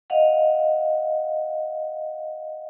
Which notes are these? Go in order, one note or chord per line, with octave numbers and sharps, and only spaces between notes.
D#5 F5 F#5